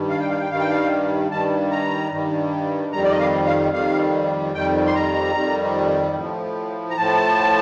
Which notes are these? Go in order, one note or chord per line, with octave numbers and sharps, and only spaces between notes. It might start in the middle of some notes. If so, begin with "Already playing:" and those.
Already playing: G2 D#3 G3
F5
G5
F5
G5
G2 D#3 G3 F5
G5
F5
G2 D#3 G3 A5
A#5
G2 D#3 G3
F2 D#3 G3 A#5
D5
D#5
F5
F5
F2 D#3 G3 F5
F2 D#3 G3 G5
C6
A#5
F2 D#3 G3
A2 F3
A#5
A2 F3 A5